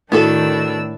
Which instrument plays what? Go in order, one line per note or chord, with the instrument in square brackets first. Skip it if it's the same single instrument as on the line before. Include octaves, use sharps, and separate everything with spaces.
[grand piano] A2 [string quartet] D#3 D4 E6 [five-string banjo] B3 F#4 A4